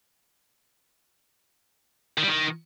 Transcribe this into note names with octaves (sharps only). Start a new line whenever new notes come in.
D#3
G3
D#3